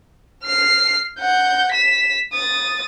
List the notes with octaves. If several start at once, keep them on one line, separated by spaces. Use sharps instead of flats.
F6 C7
F#5 G6
B6 E7
D#6 A6